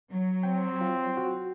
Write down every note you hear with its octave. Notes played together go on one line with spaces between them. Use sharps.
F#3
C4 G5
F4
F#4